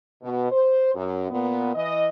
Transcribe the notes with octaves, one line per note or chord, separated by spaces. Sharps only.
B2
C5
F#2
A#2 B3
E3 D#5